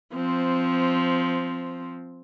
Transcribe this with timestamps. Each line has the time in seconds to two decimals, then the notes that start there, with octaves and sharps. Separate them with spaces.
0.14 F3 C4